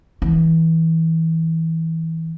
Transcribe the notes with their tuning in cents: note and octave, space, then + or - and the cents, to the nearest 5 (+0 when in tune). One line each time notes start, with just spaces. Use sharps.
E3 -25